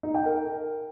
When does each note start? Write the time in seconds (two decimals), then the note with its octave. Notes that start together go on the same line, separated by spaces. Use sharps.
0.03 D#4
0.14 G5
0.26 A#4